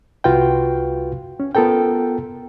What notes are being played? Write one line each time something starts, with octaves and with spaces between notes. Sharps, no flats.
C2 F4 F#4 B4 F5 G5
C#4
B3 F4 A4 A#4 G5